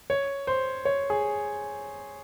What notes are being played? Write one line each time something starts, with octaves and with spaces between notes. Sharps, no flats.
C#5
C5
C#5
G#4